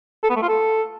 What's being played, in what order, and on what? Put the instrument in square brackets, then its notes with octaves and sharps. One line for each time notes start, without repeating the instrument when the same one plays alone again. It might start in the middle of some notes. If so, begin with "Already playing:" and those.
[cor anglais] A4
B3
A3
F4
A4